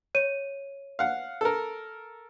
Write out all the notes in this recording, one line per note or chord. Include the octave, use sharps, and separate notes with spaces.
C#5 D#7
F5 F#5
A4 A#4